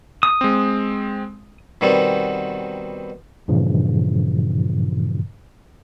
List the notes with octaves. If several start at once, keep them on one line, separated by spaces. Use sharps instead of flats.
D#6
G#3 C4
B2 D#3 G3 B3 C4
G2 A#2 C#3 E3 F3